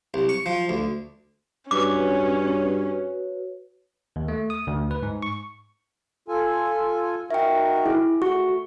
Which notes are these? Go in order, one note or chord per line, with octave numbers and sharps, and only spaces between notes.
C2
C#6
F3
D2
G2 C#4 F#4 B4 C#5 D6
D#2
A3
D#6
D2
B4
G#2
C#6
F4 A4 G#5
D#4 F#4 A#4 E5 G5
E4 G#4
A3 F#4 C#6